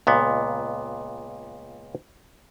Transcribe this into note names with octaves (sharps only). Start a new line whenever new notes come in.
C#2 A#2 B3